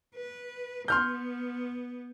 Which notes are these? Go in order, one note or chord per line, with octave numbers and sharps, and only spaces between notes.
B4
B3 C6 F6 G6